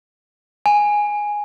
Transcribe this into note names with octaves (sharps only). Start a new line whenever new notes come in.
G#5